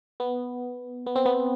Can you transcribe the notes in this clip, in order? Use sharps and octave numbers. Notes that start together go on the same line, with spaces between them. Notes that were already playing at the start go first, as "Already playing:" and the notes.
B3
B3
C4
B3